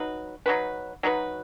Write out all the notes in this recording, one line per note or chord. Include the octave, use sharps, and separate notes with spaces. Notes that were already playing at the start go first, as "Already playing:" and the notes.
Already playing: F#3 D#4 F#4 B4
F#3 D#4 F#4 B4
F#3 D#4 F#4 B4